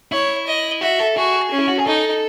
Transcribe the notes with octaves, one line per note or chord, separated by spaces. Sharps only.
E4 C#5
D#5
F#4 E5
A4
F#4 G#4
C#4
E4
F#4
G#4
D#4 A4